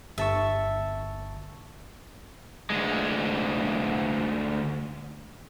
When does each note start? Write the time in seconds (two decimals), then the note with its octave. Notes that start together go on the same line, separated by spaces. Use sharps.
0.18 G1 E5 A5 C#6
2.70 D2 G#3